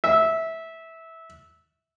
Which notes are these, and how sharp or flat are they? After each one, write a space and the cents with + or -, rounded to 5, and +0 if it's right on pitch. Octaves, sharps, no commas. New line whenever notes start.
E5 -15